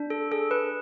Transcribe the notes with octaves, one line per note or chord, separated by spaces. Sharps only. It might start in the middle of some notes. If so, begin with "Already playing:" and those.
Already playing: D4
A4
G#4 A4
B4